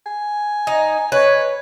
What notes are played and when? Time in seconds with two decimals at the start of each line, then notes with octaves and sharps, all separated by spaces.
0.06 G#5
0.67 D#4
1.12 B4 C#5 D#5